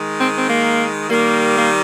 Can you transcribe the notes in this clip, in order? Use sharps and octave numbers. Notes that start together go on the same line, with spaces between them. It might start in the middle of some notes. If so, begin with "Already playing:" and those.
Already playing: D#3 G#3
C4
C4
A#3
D#3 G3 A#3
A#3